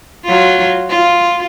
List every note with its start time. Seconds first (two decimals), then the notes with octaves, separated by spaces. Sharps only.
0.24 F#3 F4
0.90 F4